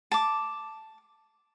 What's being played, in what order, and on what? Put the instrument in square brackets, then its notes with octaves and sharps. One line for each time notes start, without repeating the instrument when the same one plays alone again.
[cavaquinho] A5 D6